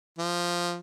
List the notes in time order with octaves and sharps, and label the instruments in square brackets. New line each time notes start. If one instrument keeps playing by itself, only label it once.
[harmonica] F3